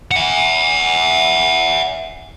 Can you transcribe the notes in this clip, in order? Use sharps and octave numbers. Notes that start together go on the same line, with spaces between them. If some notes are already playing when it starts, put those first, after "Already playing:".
E5 F#5